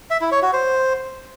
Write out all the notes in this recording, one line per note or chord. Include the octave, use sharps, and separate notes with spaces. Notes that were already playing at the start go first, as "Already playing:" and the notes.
E5
E4
C#5
F#4
C5